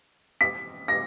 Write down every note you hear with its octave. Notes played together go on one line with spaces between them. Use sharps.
B6
A#6